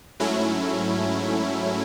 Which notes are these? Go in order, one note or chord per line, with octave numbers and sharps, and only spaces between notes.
G#2 F#3 A3 C#4 E4